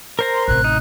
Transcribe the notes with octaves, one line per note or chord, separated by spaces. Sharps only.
A#4 C5 A#5
C6
A1 C3 F#6
D#4